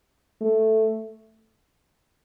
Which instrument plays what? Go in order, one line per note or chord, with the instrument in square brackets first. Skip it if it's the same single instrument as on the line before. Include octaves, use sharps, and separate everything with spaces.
[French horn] A3